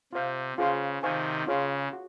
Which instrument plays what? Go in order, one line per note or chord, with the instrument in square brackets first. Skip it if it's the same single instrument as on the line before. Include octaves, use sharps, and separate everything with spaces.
[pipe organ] C3 [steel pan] F4 C5 F5
[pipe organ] C#3 [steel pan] F4 G#4 C5 F5 C6
[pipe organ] C3 D#3 [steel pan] C5 F5 G#5 C#6
[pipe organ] C#3 [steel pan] F4 G#4 C#5 F5 C6
[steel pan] F#4